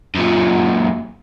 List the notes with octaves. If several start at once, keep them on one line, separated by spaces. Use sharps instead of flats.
F#2 A#2